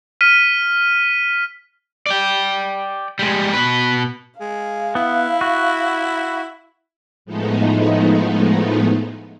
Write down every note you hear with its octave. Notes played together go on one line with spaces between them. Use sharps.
F6 B6 D#7
D5 G5
G3 G#3
B2 B4
G#3 F5
B3 E4
F#4
A2 F3 G#3 A3 B3 D#4